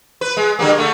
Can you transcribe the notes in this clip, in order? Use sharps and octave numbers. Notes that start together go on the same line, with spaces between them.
B4
G#3
D3 G3 A#3
D3 A3